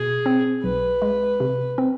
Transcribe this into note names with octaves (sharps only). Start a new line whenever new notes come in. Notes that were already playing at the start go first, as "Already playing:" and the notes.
Already playing: B2 G#4
C4
B1 B4
G#3
C3
C4